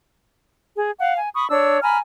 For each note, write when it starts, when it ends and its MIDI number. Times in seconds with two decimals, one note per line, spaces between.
0.75 0.91 68
1.00 1.16 77
1.00 1.16 78
1.18 1.29 80
1.34 1.47 83
1.34 1.47 85
1.34 1.47 87
1.50 1.81 62
1.50 1.81 73
1.50 1.81 88
1.82 1.98 80
1.82 1.98 82
1.82 1.98 83
1.82 1.98 89